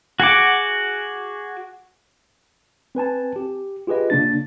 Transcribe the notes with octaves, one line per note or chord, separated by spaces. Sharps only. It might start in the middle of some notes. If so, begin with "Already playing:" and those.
F#4 G#4 F#5 D6
C4 B4 G#5 A5
G4
F4 G4 G#4 B4 D#5
C#3 A#3 D4 A6